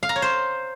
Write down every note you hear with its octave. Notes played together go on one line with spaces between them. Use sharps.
F5
A#5
C#5
C5